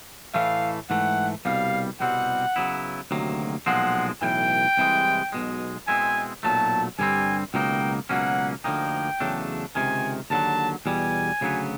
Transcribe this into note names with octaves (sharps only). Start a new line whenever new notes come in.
A2 E3 A3 F5
G#2 E3 A3 F#5
C2 B2 G3 F5
C2 B2 G3 C4 F#5
C#3 F#3 B3 E4
D2 C3 D#3 F#3 A#3
B1 A#2 F3 G#3 C4 F#5
B1 A2 E3 G5
C2 C3 E3 G#3
B1 B2 G#3
B2 G#3 C4 E4 G#5
B1 A#2 F#3 A3 A5
G2 D3 G3 C4 G#5
C#2 B2 F#3 A#3 D#4 G5
C#2 B2 F#3 A#3 C#4 F#5
D2 D3 F3 A#3 D#4 G5
E2 C#3 F#3 A3 D4
C#2 C3 D#3 G#5
D#2 D3 F#3 A5
E2 B2 G3 G#5
D2 C#3 F#3 B3